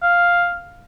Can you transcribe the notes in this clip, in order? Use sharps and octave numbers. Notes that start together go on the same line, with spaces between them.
F5